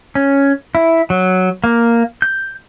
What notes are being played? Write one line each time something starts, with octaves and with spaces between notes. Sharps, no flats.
C#4
E4
F#3
A#3
G6